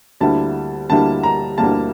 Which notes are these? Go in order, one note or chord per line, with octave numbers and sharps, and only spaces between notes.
D2 D3 G3 A#3 E4 A5
D2 D3 G3 A#3 E4 A5
A#5
D2 D3 G3 A#3 E4 A5